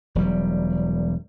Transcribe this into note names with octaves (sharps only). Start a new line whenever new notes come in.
E1 F#3 G3